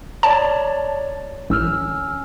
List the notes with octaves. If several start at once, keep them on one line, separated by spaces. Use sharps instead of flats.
C#5 D5 A5
A1 C#4 E6 F6